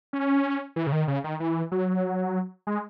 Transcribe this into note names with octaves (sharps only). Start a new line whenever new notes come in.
C#4
E3
C#3
D#3
C#3
D#3
E3
F#3
G#3